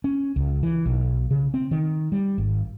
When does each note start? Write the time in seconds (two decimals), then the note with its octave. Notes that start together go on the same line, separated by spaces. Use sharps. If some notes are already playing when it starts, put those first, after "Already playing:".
0.04 C#4
0.36 C#2
0.63 E3
0.86 B1
1.31 C#3
1.54 C4
1.71 D#3
2.12 G3
2.38 G#1